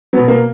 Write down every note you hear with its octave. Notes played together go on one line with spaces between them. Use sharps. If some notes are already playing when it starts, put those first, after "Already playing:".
B2 F#3 B3
A#3